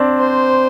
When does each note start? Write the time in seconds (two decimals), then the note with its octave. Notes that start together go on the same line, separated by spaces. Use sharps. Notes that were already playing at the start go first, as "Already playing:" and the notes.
Already playing: C4 D4
0.19 C5